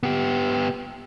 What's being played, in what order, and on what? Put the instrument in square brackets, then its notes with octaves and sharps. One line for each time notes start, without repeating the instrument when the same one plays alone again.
[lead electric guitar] B3 G4